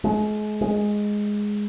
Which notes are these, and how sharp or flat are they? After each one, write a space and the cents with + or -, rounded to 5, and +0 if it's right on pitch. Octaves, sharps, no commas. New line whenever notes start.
G#3 +35
G#3 +0